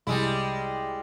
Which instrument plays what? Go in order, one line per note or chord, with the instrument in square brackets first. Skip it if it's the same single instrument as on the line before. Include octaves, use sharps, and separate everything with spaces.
[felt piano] C2 [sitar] G3 G#3 E4